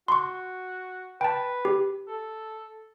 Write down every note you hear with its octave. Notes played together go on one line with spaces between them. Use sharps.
F#4 C6 C#6
B4 G5 A5
G4
A4